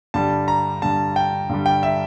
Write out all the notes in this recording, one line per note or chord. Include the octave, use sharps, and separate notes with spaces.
G2 D3 G3 A5
A#5
G2 D3 G3 A5
G5
G2 D3 G3
G5
E5